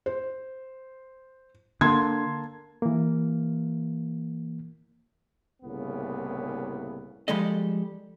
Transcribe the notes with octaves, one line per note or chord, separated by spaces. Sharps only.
C5
D3 A#3 A5 C6 G#6
E3 A#3
C2 A2 C#3 A#3 B3
F3 G3 G#3 A4 D#5